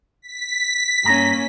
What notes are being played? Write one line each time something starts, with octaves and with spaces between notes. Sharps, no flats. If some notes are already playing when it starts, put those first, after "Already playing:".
B6
G2 A#3 C#4 A#5